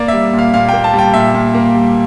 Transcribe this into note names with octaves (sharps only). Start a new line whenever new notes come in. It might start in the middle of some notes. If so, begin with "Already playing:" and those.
Already playing: A#3 D5
G3 E5
A#2
F5
A#2 F5
A#3 G5
A5
G3
G5
A#2 E5
A#2
A#3
G3